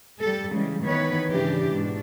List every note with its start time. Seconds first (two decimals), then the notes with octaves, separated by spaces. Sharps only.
0.22 G3 A4
0.53 C#3 E3 G3 G#3
0.84 D#3 E3 B3 B4 C#5
1.30 G#2 C#3 E3 D4 G4
1.70 G#2 B2 D4